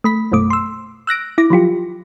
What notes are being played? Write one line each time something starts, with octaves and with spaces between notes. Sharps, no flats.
A3 B5 B6
A#1 F#2 B2 A3 D6
C6 E6
E6 F#6 A#6 D7
E4 D6 A#6
F3 F#3 F4 G4